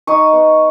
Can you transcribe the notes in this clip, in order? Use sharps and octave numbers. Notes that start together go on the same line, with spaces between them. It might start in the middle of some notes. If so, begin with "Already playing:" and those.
D#4 C#6 D#6
B3